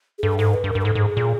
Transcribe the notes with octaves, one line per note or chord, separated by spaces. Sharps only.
G#4
G2 A4
G#2 A4
B4
G2
A#4
G2
A#4
G#2 A4
G#2
G#4
A#2